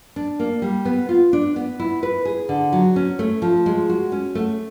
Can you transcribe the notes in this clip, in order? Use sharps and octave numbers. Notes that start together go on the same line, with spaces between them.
D4
A#3
G3
B3
F4
D4
B3
E4
B4
G#4
D3
F#3
C#4
A3
F3
G#3
F#4
C#4
A3